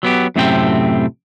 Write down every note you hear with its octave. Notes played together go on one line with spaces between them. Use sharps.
F#3 B3 G4
F#2 A2 C3 A3 C4 G5